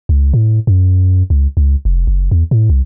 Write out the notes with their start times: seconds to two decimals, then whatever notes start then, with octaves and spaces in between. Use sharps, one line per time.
0.09 C#2
0.34 A2
0.67 F#2
1.30 C#2
1.57 C#2
1.85 F1
2.07 F#1
2.31 E2
2.51 A2
2.70 C2